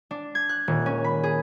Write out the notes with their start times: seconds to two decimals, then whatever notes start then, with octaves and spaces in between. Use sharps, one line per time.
0.11 D4
0.35 G#6
0.49 F#6
0.68 D#1
0.86 C#4
1.04 B5
1.23 G#4